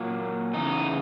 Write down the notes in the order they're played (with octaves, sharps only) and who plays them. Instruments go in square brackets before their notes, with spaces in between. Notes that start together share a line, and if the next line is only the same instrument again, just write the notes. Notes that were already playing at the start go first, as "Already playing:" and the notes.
Already playing: [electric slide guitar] A#2 F#3 A#3
E2 C#3 D#4